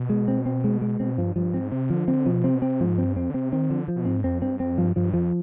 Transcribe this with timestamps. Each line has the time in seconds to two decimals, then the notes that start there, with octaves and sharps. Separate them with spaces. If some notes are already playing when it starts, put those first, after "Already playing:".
Already playing: B2
0.09 G#3
0.28 C4
0.46 C4
0.64 G#3
0.81 G#3
1.00 B2 C4
1.18 G2 F3
1.36 G2 F3
1.53 G#2 C4
1.72 C3 C4
1.90 D3 F3
2.08 D3 C4
2.26 B2 F3
2.44 C3 C4
2.55 B2
2.62 C3 C4
2.81 G#2 F3
2.97 G2 C4
3.16 F2 C4
3.30 D3
3.34 C3 C4
3.52 D#3 C4
3.69 D3 F3
3.88 F3
3.96 B2
4.05 G#2 C4
4.24 F2 C4
4.42 G2 C4
4.60 F2 C4
4.78 G2 F3
4.96 G2 F3
5.13 F2 F3